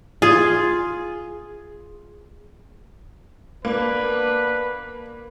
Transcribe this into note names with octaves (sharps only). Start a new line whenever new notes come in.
F4 G#4
A#3 B3 D4 B4